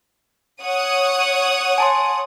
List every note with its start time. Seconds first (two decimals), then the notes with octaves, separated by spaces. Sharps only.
0.63 C#5 F#5 D#6
1.78 G#5 A5 C6